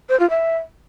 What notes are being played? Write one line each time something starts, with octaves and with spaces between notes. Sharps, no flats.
C5
F4
E5